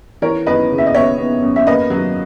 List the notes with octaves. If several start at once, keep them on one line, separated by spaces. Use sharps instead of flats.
E3 A#4 C#5
F#2 B4 D#5
C#3
E5
D#5
B3 C#5 E5
B3
F#2
E5
A#3 B4 D#5
F#3